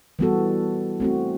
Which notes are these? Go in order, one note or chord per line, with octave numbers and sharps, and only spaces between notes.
E3 G3 B3 F#4 A4
A3 C4 F#4